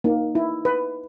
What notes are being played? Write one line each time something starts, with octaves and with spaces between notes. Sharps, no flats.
A#3 D#4
E4
B4